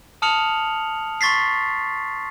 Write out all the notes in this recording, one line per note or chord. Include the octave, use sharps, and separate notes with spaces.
A5 D#6 F6 C#7 F7 F#7
C6 C#6 A6 B6 C7